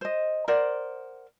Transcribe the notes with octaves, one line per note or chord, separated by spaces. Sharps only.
C5 D#5
A#4 C5 D5 F#5